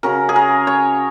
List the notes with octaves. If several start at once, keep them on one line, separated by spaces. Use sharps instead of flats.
C#3 F#3 C#4 A#4
G#4
A#4
C#5